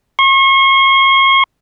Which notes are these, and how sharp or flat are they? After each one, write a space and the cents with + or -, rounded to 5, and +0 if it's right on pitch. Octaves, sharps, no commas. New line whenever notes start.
C#6 -40